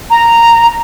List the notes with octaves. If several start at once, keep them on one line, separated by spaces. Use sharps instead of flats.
A#5